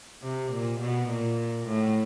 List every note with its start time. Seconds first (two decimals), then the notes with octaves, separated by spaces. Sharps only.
0.23 C3
0.52 A#2
0.80 B2
1.09 A#2
1.68 A2